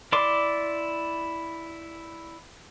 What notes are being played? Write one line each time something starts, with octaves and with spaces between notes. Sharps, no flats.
E4 D5 C6 D6